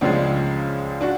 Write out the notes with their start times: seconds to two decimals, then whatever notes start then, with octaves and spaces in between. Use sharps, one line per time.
0.01 C#2 C#3 F3 G#3 D4
1.01 D4 F#4